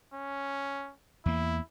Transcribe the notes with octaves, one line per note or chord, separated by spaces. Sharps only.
C#4
E2 A#3 E4